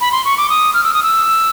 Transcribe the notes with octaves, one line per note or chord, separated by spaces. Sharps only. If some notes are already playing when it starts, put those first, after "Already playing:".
B5
C6
C#6
D6
D#6
F6
E6
D#6
E6